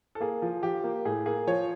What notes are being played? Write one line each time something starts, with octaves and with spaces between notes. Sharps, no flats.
A4
A#3 G#4
F3
F3 G4
A#3
A2 G#4
A#3 G#4
F3 C#5